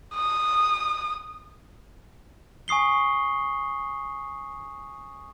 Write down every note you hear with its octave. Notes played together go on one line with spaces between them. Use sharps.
D#6
G#5 C#6 D#6 C7 G7